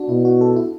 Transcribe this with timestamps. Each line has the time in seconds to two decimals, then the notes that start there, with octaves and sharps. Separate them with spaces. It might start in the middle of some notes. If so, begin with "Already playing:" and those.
Already playing: D4 F#4
0.09 B2 E4
0.25 F#4
0.41 A4
0.56 E4